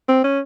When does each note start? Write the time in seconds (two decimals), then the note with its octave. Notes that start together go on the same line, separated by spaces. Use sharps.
0.09 C4
0.24 C#4